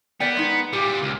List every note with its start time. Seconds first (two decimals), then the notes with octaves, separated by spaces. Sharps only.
0.20 B3 A#4 D5 G5
0.37 G#3 D#4
0.73 A#2 G3 G4
1.02 C#2